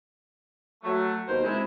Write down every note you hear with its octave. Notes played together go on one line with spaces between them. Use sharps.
F#3 A3
D#2 B2 A#4 C5
C3 G#3 E4